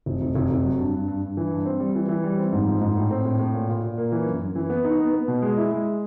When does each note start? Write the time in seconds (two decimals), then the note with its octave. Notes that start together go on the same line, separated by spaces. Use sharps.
0.06 F1
0.21 F1
0.35 F1
0.50 F1
0.64 F#3
0.79 G2
0.94 G2
1.08 G2
1.22 G2
1.37 E3
1.51 G2
1.66 C4
1.80 G3
1.95 E3
2.09 E3
2.24 G3
2.38 C4
2.52 G#2
2.67 F3
2.81 G#2
2.96 A2
3.11 C4
3.25 A2
3.39 A2
3.54 A#2
3.69 A#2
3.83 A#2
3.98 A#3
4.12 E3
4.26 F#2
4.41 F#2
4.56 E3
4.70 B3
4.84 D#4
4.99 B3
5.13 B3
5.28 B2
5.42 G#3
5.57 E4
5.71 G#3